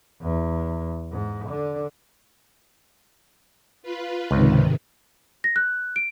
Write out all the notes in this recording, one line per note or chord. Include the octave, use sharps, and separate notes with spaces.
E2
G#2
D3 D4
F4 B4
C#2 G#2 C3 D#3
A#6
F#6
D7